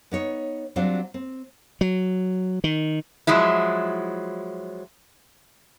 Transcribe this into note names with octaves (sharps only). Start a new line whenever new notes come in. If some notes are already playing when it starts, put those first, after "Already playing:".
B3 D#4 C#5
F#3 G3 C4 D4 F4 F#4
C4
F#3
D#3
F3 F#3 G#3 E4